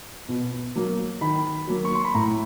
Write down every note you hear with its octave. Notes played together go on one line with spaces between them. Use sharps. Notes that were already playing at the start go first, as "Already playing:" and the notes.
B2
F#3 A#3
D#3 B5
F#3 A#3
C#6
C6
B5
A2 A#5